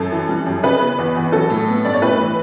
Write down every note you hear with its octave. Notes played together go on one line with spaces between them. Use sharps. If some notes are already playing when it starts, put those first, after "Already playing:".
Already playing: F#2 A4
E3
G3
F#2
C#3 B4
B3
E2
E2
F#3 A4
A2
B3
G2 D5
C#5
A2 B4
E3